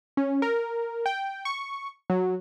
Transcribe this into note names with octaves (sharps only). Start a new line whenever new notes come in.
C#4
A#4
G5
C#6
F#3